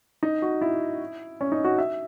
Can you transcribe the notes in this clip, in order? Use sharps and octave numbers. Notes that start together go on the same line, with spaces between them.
D#4
F#4
E4
C#4
D#4
F#4
E5